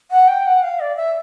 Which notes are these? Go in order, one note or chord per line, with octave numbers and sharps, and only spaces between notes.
F#5
G5
F#5
F5
D5
E5